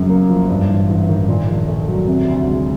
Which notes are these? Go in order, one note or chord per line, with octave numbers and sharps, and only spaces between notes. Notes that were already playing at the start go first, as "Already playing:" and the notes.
Already playing: F#2 C#3
A#3
F3
G2
A1
A1
D#3
A#2
A#1
A3
F#3
C3
D2
G#3